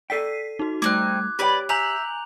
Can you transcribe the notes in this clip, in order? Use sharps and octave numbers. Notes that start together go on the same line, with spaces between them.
A4 D5 G5 B6 C7 D#7
D#4 F#4
G3 A3 C4 D#4 D6 F#6 G#6
G4 B4 C#5 D5 G5
E5 G#5 A#5 G6 F7 F#7